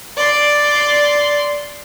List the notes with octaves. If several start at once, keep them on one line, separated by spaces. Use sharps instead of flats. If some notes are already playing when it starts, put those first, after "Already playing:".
D5 C6